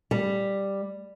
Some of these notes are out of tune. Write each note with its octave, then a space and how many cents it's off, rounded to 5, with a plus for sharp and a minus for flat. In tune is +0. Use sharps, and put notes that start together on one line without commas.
G3 +5